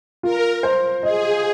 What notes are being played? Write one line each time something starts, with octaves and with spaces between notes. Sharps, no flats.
F4 A#4
C5
G#4 D#5